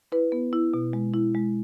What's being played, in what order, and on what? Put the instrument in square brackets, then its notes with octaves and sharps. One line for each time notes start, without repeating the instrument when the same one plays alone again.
[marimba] E4 B4
B3
E4
B2
G#3
E4
G#3